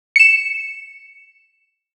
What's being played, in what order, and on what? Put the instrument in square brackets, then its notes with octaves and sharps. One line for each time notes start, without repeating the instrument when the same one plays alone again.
[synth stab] C#7 E7